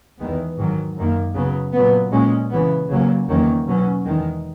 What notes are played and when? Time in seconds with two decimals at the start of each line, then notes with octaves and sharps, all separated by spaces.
0.19 E2 D#3 G#3 B3
0.58 G#2 D#3 F#3
0.96 F#2 D#3 A#3
1.35 C#3 F#3 B3
1.73 A#2 F#3 B3
2.12 A#2 G#3 C#4
2.51 C#3 E3 B3
2.90 C#3 F#3 A#3 C#4
3.28 E2 D#3 F#3 A#3 C#4
3.67 B2 F#3 C#4
4.06 E2 D#3 G#3